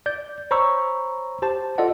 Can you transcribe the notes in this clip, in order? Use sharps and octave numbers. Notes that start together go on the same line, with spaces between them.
D5 G6
C5 C#5 A#5 B5 C#6 E6
G4 C5 A5
F4 A4 D5 D#5 F#5